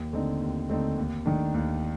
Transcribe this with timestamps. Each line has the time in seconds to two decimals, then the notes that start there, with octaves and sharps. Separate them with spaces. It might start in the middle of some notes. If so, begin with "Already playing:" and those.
Already playing: D#2
0.13 D3 A3 C4 D#4
0.41 D#2
0.69 D3 A3 C4 D#4
0.97 D#2
1.26 D#3 A3 D4
1.54 D#2